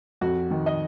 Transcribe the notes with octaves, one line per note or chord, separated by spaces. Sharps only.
F2 F#4
D#3
D#5